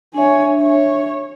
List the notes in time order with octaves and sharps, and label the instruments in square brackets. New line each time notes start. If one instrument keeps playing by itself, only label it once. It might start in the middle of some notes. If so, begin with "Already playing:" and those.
[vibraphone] D4 E5 [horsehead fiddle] C#5 G#5
[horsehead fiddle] C#5